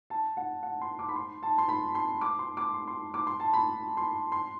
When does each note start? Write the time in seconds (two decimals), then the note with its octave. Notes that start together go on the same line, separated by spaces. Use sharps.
0.10 A5
0.37 F#5
0.63 F#5
0.81 C6
0.99 D6
1.09 B5
1.16 C6
1.43 A5
1.58 C6
1.69 B5
1.95 C6
2.21 D6
2.39 C6
2.57 D6
2.74 C6
2.88 C6
3.14 D6
3.27 C6
3.40 A5
3.53 B5
3.97 C6
4.32 C6